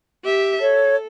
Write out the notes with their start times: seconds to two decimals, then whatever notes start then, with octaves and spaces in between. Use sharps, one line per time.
0.23 G4 E5
0.61 A4 C#5